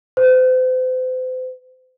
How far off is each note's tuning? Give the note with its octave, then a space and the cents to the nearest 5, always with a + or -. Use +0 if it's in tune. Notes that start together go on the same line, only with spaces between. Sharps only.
C5 -40